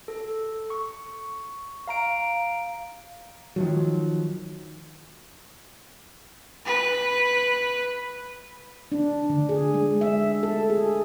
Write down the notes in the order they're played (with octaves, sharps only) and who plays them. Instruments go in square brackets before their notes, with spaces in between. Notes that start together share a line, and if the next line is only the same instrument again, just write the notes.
[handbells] A4
C#6
F5 A#5 D7
[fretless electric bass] D#3 F3 F#3
[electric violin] B4
[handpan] D4
D3
G#4
G#3
E5
A4
G#4